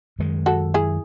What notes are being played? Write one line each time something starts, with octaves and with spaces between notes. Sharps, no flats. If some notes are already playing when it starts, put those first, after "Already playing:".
F#2 D#3 G#3
F#4 A4
E4 G#4